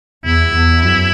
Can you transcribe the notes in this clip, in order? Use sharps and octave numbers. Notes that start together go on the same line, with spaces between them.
E2 E4
E2
F#2